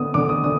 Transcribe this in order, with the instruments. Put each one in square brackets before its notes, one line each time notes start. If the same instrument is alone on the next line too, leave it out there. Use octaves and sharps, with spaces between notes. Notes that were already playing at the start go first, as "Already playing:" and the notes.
Already playing: [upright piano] D3 B3 D#6
D3 D6
D#6
D3 D#6